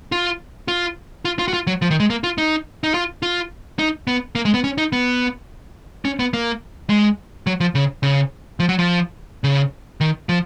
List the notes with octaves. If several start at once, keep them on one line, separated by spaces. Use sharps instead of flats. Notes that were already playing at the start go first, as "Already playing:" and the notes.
F4
F4
F4
F4
F#4
F4
F#3
F3
D#3
G#3
A#3
F4
D#4
D#4
F4
F4
D#4
B3
A#3
G#3
B3
C#4
D#4
B3
C#4
B3
A#3
G#3
F#3
F3
C#3
C#3
F3
F#3
F3
C#3
D#3
F3